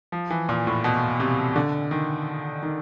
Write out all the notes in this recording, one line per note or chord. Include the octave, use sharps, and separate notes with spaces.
F3
E3
A#2
A2
B2
C3
D3
D#3
D#3